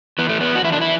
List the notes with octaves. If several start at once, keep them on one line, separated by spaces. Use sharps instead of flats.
E3 B3
A3
E2 B3
F#4
E4
E3 D4
E4